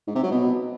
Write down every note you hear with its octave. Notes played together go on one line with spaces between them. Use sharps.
G#2
C3
F#3
B2